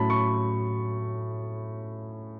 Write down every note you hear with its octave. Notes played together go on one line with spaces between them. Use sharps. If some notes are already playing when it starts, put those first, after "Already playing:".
Already playing: A2 F#3 C#4 A5 B5
C#6